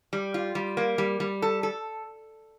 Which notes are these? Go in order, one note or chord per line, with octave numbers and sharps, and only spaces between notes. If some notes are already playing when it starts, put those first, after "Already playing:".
G3
F4
G3
A#3
G3
G3
A4
A4